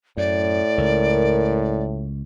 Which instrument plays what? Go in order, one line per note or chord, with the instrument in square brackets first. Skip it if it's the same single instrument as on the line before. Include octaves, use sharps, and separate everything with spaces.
[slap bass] F#2 [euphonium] A2 [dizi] D5
[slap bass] C#2 [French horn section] A#4